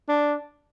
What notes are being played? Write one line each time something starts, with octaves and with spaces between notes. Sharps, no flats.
D4